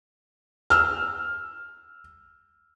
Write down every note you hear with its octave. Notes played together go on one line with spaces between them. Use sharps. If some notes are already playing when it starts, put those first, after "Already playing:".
E6 F6